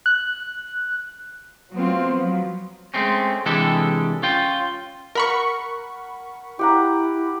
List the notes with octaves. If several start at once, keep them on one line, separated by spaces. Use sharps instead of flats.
F#6
F#3 A3 B3 C4 F4
F3 F#3
G#3 A3 C4 C#4
C3 E3 G#3 D4 G4 A4
C#4 F4 G5
A#4 F#5 B5 C#6
E4 G4 F#5 A#5